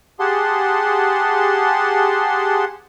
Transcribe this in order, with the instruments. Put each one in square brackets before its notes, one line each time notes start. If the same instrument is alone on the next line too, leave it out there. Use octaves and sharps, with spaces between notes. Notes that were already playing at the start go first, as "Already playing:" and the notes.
[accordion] G4 G#4 F#5 A5 C6